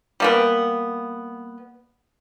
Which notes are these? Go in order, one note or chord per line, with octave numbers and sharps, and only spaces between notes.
G3 A#3 B3